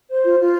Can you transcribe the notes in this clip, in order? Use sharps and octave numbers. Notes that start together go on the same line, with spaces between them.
C5
F4
F4